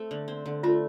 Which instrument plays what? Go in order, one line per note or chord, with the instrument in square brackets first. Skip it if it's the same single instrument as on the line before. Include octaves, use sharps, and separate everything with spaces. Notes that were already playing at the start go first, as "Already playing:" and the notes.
Already playing: [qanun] A3 C4
D3
C4
D3
[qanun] A3 [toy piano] F4